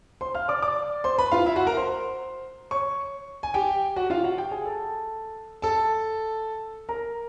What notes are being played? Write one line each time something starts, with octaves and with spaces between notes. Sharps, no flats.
C5 C6
F5 F6
D5 D6
D5 D6
C5 C6
B4 B5
F4 F5
E4 E5
F#4 F#5
A#4 A#5
C5 C6
C#5 C#6
G#5
G4 G5
F#4 F#5
F4 F5
F#4 F#5
G4 G5
G#4 G#5
A4 A5
A4 A5
A#4 A#5